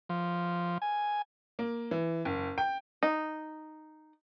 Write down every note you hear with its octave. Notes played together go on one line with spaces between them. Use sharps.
F3
G#5
A#3
E3
F#1
G5
D#4